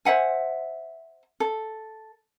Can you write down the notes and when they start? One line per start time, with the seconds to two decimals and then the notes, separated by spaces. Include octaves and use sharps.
0.05 C5 E5 F#5 G#5
1.40 A4